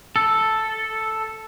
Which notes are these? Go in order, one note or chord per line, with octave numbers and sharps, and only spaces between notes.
A4